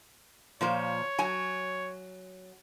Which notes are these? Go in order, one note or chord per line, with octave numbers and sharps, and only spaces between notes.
A#2 F3 C5 C#5
F#3 G#5